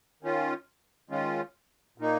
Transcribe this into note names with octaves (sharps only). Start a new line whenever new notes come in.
D#3 C#4 F4
D#3 G#3 C#4 F4
A#2 A#3 D#4